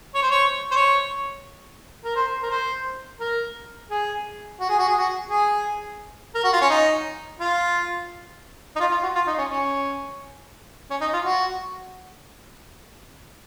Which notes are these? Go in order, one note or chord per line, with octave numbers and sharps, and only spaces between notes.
C#5
C5
C#5
C5
C#5
A#4
C5
A#4
C5
A#4
G#4
F#4
G#4
F#4
G#4
F#4
G#4
A#4
F#4
F4
C#4
D#4
F4
D#4
F4
F4
F#4
F4
D#4
C#4
C#4
C#4
D#4
F4
F#4